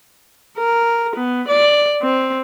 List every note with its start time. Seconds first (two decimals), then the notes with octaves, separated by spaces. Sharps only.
0.58 A#4
1.16 B3
1.48 D5
2.02 C4